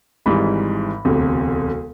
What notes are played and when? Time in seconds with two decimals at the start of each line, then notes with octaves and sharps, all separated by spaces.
0.26 G#1 G#2 E3 G3 B5
1.05 E1 D2 C3